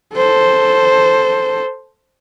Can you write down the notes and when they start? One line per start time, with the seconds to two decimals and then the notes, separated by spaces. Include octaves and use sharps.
0.14 A4 C5